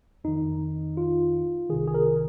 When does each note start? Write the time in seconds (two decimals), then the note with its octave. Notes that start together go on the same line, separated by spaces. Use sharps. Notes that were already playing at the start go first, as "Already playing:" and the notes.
0.24 F2 D#3 D#4
0.97 F4
1.70 C2 C3 D#3 G#4
1.88 G#4
1.94 A#4